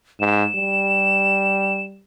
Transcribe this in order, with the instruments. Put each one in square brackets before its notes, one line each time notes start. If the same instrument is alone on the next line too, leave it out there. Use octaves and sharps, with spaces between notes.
[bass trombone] G#2 [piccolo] E7
[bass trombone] G3